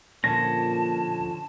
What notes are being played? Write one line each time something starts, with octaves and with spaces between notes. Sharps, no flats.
A#2 D3 F3 C#4 A5 A#6